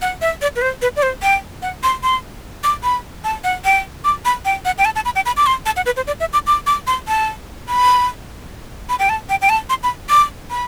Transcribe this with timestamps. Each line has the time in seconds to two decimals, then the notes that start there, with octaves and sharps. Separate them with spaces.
0.02 F#5
0.21 E5
0.41 D5
0.56 B4
0.62 C5
0.82 B4
0.96 D5
1.03 C5
1.22 G5
1.62 F#5
1.83 C6
2.03 C6
2.64 D6
2.83 B5
3.24 A5
3.44 F#5
3.65 G5
4.04 D6
4.25 B5
4.45 G5
4.65 F#5
4.78 G5
4.85 A5
4.96 A5
5.05 B5
5.15 G5
5.26 B5
5.37 D6
5.46 C6
5.66 A5
5.76 F#5
5.86 B4
5.96 C5
6.07 D5
6.20 E5
6.33 D6
6.47 D6
6.67 D6
6.87 C6
7.08 A5
7.68 B5
8.89 B5
8.99 G5
9.09 A5
9.29 G5
9.42 G5
9.49 A5
9.69 C6
9.83 B5
10.10 D6
10.50 B5